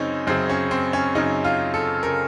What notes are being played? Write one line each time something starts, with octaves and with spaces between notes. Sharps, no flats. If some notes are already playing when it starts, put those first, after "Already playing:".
Already playing: F#2 C#3 C4 C#4 D#4
F#2 C#3 C4
C#4
C4
C#4
F#2 C#3 D#4
F4
A4
C#3 A#4